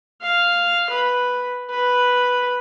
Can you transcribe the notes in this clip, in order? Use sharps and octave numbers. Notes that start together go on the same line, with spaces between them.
F5
B4
B4